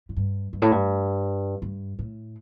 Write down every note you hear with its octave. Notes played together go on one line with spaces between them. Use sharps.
A2
G2
G2
A2
G2
G2
A2